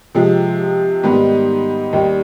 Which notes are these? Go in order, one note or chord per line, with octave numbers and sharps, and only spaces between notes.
C3 F3 G#3
G#2 D#3 G3 B3
D#2 D#3 G3